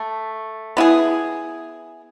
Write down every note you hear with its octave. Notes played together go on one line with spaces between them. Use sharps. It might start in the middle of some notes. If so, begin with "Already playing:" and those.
Already playing: A3
B3 E4 G#4